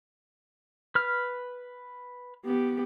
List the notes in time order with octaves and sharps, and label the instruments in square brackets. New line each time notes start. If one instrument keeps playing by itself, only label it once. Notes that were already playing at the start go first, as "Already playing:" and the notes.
[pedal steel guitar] B4 F6
[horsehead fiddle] B3 G4